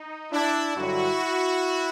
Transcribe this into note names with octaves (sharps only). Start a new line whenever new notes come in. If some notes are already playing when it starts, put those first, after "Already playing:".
Already playing: D#4
D4 E4
G2 D3 F#3 E4 F#4